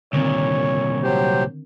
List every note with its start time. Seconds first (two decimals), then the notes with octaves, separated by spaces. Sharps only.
0.13 C2 A#2 D3 D#3 C4 C#5
1.03 F#3 G4 C5